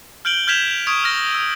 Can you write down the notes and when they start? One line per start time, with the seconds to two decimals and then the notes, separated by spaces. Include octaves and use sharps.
0.25 F6 G6 D7 F#7 G7
0.47 F6 G6 G#6 B6 E7 F7
0.71 F7
0.87 C#6 D#6 G#6 D7
1.03 E6 F6 A#6
1.35 E6